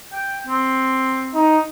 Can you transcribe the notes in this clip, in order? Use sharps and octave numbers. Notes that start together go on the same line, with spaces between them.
G5
C4
D#4